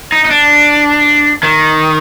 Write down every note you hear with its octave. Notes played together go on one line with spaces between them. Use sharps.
D#4
D#4
D4
D#3